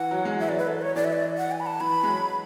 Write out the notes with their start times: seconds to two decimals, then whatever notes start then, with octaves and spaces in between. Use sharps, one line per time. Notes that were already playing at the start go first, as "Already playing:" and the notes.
Already playing: E3 F#5
0.11 F#3
0.25 G#3
0.32 F#3
0.40 E3 E5
0.48 F#3 D5
0.58 B4
0.67 A4
0.81 C#5
0.96 E3 D5
1.05 E5
1.13 D5
1.38 F#5
1.52 G#5
1.60 B5
1.66 A5
1.80 E3 B5
2.03 G#3
2.08 F#3